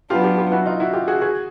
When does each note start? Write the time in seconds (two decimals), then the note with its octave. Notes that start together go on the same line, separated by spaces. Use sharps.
0.10 F#3 B3 D4 F4 G4
0.24 F4 G4
0.38 F4 G4
0.52 E4 F#4
0.66 D#4 F4
0.80 E4 F#4
0.93 F4 G4
1.08 F#4 G#4
1.21 F#4 G#4